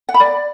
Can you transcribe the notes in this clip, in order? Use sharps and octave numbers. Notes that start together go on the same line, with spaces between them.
F#5
B5
D5